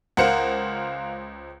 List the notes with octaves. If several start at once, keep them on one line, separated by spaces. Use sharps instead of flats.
C#2 A#4 C5 F5 F#5 C#7